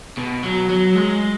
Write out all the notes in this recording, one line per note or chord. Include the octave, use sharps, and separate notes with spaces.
B2
F#3
F#3
G#3